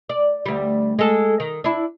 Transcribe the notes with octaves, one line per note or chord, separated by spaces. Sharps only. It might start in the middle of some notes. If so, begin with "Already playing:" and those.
D5
D2 G3
G#3 A4
D#3
D4 E4